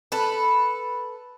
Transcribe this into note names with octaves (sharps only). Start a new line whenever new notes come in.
A4 B4